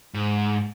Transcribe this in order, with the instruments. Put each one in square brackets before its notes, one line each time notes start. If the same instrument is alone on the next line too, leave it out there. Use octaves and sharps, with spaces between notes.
[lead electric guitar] G#2